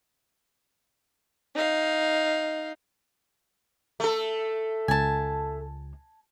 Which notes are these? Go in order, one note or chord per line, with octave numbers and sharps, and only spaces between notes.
D#4 F5
A3 A4
C#2 G#5 A5